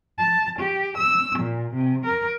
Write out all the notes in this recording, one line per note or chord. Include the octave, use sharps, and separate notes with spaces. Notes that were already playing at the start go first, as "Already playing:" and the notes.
A5
G4
E6
A#2
C3
A#4